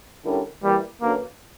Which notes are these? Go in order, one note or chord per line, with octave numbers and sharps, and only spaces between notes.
D3 G3 C#4 E4 A#4
E3 G3 A#3 E4 G4 A#4
D3 F#3 A#3 C#4 F#4 B4